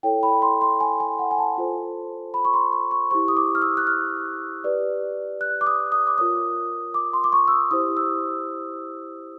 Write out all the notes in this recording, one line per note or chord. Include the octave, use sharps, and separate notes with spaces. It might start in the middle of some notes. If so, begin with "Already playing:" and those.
E4 A4 C#5 G5
B5
C6
C6
G#5
G#5
F#5
G#5
A5
F4 A4 C5
B5
C#6
C6
C#6
C#6
E4 G4 C5 C#6
D#6
D6
F6
E6
F#6
F6
G4 B4 D5
F#6
D6
D#6
D#6
D6
F4 A#4 C#5 D#6
D6
C6
D6
C#6
E6
D#6
E4 G4 C5 D#6
E6